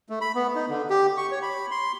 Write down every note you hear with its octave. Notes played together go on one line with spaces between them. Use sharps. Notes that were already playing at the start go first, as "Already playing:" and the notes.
A3
B5
B3
D#4
D3
G4
C#6
C#5
B5
C6